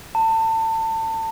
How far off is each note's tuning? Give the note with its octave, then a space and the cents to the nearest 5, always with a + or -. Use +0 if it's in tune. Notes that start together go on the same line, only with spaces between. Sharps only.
A5 +30